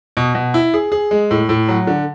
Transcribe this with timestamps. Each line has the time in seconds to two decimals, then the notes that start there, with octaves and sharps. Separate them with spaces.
0.17 B2
0.35 B2
0.54 E4
0.74 G#4
0.92 G#4
1.11 G#3
1.31 A2
1.49 A2
1.69 F#3
1.87 D3